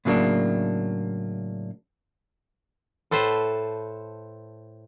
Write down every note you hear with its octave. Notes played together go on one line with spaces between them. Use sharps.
A2 C#3 F#3 A#3 D4
A2 A4 B4 C5